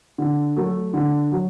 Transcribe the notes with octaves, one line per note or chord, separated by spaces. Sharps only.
D3
F#3 A3
D3
F#3